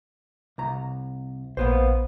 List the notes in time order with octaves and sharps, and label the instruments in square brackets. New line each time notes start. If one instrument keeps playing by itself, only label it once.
[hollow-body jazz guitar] C2 A#5
[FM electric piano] A#1 [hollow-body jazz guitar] A#3 B3 C5